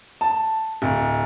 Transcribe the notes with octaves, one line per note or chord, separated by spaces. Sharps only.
A5
D1